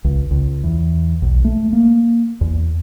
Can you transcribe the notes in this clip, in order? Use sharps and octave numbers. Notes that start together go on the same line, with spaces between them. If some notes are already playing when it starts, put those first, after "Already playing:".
C#2
C#2
E2
B1
A3
A#3
E2